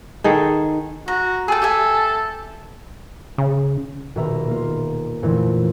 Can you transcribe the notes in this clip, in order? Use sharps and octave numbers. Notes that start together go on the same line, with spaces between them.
D#3 G#4 A4
F#4 A#5
G#4 A4 G5
G4 E5 G#5
C#3
D#1 B2 D#3 E5 A#5 B5
A#3 F4
F2 A#2 D3 E3 A3 E4